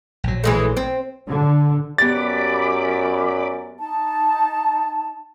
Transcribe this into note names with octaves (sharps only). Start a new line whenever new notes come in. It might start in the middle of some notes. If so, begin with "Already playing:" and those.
A#1 F#3
E3 G#3 A3
C4
D3
F#2 B3 G4 G#4 D5 B5 D6 A6
D#4 A5